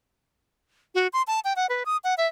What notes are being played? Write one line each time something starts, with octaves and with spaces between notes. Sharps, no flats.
F#4
C6
A5
G5
F#5
B4
D#6
F#5
E5